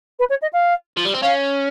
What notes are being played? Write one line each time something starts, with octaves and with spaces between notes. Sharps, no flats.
B4
C#5
D#5
F5
F3
G3
C4
C#4 F5